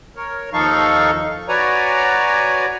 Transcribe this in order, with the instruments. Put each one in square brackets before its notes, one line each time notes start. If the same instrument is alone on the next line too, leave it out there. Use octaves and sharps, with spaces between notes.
[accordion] A#4 C#5
D#2 F3 D#4 A4 F5 C#6
F#4 B4 C#5 D5 G#5 A#5